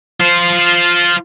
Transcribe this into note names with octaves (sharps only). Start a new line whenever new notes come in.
F4 C5